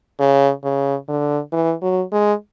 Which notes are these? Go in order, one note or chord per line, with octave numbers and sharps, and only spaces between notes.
C#3
C#3
D3
E3
F#3
G#3